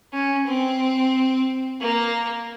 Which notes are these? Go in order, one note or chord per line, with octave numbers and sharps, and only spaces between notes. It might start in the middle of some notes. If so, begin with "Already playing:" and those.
C#4
C4
A#3